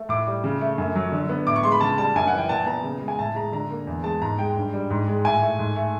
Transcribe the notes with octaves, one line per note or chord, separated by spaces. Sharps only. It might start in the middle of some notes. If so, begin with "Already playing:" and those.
Already playing: A3
A2 D6
G3
C#3
A3
F#2
F#3
D3
B3
A2 D6
C#6
G#3 C6
B5
C#3 A5
G3 A5
F#2 G#5
F#5
E3 G5
A#2 A5
B3 A#5
C#3
G#3
G#5
A2 A5
G#3 A#5
D3 A#5
A#3
E2
G#3 A5
G#2 A#5
G#3 G5
G2
G3
G#2
G#3
A2 G#5
A3
G#2
A3